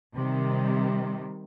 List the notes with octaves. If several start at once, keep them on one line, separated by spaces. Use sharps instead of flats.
C3 D#3 G3